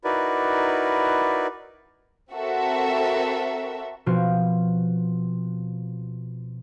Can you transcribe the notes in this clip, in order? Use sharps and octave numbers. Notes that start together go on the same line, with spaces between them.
D#4 E4 F#4 A#4 B4 D5
C4 F#4 A4 A#4 E5
B2 F3 C4 F4 F#4